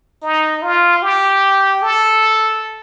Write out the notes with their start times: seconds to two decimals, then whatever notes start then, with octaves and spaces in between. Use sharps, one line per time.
0.22 D#4
0.62 F4
1.02 G4
1.82 A4